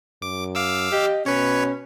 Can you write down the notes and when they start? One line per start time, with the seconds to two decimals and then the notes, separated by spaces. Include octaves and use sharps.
0.22 F#2 D6
0.55 F5 D6 E6
0.92 G4 D#5
1.26 B2 C#4 B4 C#5